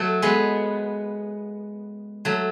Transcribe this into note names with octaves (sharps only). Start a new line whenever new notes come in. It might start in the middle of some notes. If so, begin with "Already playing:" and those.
Already playing: F#3 A3
G#3 B3
F#3 A3